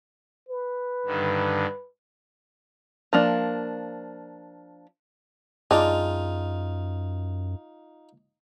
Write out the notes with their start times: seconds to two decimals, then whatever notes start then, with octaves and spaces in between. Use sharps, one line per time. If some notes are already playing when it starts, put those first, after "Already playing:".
0.49 B4
1.06 G2 D3 D#3
3.13 F3 A#3 D4
5.71 F#2 G#3 D4 D#4 F4